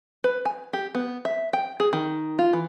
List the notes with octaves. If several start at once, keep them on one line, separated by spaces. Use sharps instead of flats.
B4
G#5
G4
B3
E5
G5
G#4
D#3
F4
E3